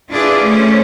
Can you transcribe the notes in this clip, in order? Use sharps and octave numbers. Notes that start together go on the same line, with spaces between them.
D4 E4 F4 G#4 B4 D5
A3 C#4 C5